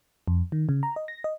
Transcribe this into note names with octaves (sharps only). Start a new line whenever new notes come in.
F2
D#3
C#3
A#5
D#5
A#6
D#5